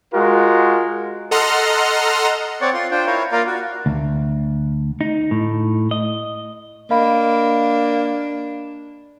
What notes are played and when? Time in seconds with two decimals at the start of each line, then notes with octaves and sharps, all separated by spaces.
0.14 G#3 F4 F#4 A#4
1.31 A4 D#5 F#5 A#5 C6 F6
2.61 C4 C#5 D5 F#5
2.74 F4 C6
2.91 D4 F4 C5 G5
3.07 E4 A#4 C#5 F5
3.32 A#3 F4 A#4 D5 F5
3.47 F#4
3.86 D2
5.01 D#4
5.31 A2
5.91 D#5
6.90 A#3 D4 D#5 F5 B5